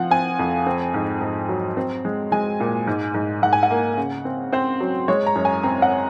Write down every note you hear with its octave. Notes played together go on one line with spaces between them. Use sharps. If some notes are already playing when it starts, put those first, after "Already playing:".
Already playing: F3 C4 F5 F#5
C4 G#5
F2
C4
G#2
G#2
F#3
C4
G#3
G#3 G#5
A#2
G#2
G#2
G#2 F#5
G#5
F#5
A#3
C#3
C4
C4 C5
F#3
G#3 C#5
A#5
F#2
G#5
C4 A#5
F#5